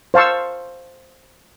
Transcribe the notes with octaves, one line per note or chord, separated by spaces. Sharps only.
C5 F5 A5 C#6 E6